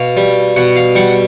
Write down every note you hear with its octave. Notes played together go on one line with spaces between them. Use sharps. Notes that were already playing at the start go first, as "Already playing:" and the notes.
Already playing: B2 F5
G3
B2 F#5
F5
G3 F#5